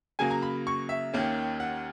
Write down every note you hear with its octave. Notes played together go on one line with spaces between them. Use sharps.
C#3 F#3 A#3 G#5
A#5
B5
C#6
E5
D#2 D#3 A#3 C#4
F#5